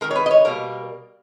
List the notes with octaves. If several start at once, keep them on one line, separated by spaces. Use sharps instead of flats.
D#3 G#3 A#4
C#5
B4
D#5
C#5
B2 G3 A#3 A#4